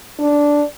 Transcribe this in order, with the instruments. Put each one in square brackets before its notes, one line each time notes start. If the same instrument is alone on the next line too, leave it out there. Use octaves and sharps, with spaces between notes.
[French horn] D4